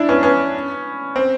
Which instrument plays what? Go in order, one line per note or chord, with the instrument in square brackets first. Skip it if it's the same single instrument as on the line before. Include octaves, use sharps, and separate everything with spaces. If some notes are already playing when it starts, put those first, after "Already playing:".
Already playing: [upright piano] D4 E4
B3 C#4
B3 C#4
C4